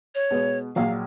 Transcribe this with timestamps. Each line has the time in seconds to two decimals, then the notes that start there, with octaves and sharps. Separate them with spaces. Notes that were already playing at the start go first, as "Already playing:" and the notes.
0.15 C#5
0.31 B2 G#3 B3
0.76 A#1 A#2 F#3 F5